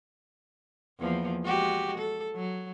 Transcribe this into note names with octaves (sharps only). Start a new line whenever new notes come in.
E2 F3 A#3
G#3 F#4 G4
A4
F#3